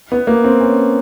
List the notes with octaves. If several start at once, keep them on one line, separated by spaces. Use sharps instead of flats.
B3
A#3
C4
C#4